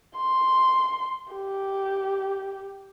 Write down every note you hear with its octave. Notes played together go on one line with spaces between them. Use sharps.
C6
G4